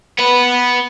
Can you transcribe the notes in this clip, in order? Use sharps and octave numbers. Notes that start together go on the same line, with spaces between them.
B3 B4